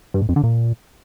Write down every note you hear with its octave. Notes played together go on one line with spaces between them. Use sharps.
G2
A2
F2
D3
A#2